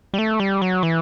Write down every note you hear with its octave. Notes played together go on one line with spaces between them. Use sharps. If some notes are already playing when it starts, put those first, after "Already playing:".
G3
A3
G3
F#3
E3